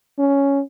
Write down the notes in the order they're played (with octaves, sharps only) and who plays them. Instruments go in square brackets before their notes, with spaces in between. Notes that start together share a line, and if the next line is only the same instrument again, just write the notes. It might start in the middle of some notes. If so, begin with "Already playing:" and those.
[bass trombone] C#4